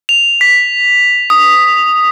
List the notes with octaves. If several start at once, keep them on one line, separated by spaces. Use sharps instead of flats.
F7
B6
D#6